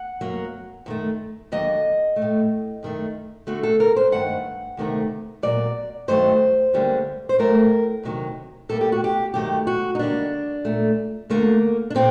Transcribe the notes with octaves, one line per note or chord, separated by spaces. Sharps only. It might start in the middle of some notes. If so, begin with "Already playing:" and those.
Already playing: F#5
F#2 F#3 A#3
F#2 D#3 A3
D#2 D3 F#3 A#3 D#5
A3
A2
F#2 D#3 A3
D2 D3 A3 F#4
A4
A#4
C5
G2 D#3 A3 F#5
D2 C3 D#3 A3
A#2 F#3 A#3 D5
G2 D#3 F#3 A3 C5
D2 D3 G3 A#3
C5
A2 F#3 A3 A#4
D2 C3 D#3 F#3
A2 G3 A#3 A4
G4
F#4
G4
G2 D#3 F#3 A3 G4
F#4
D#4
D#2 D3 G3 A#3 D4
A#2 A3
D2 D3 A3 A#3
D4
A#2 A3 C4